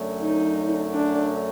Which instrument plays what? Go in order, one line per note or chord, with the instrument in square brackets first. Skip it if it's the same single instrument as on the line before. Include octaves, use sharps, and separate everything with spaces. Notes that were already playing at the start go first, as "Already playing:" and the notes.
Already playing: [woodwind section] F#2 D3 F#3 A3
[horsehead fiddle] D#4
D4